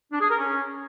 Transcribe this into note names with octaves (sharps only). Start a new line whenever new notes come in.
D4
G#4
A#4
C#4